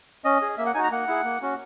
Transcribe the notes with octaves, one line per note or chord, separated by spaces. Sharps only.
C#4 D#5
G#4
A#3 E5
F#5
D#4 F#4 G#5
A#5
A#3 F#5
E4 G#4
A#3
C#4 F#4